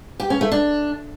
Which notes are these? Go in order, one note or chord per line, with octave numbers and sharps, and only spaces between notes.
G4
C#4
A3
D4